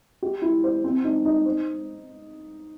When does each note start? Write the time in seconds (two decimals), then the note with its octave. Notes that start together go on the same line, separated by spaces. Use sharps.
0.22 G4
0.42 E4
0.64 C5
0.84 C4
1.04 D#4
1.25 D#4
1.45 C5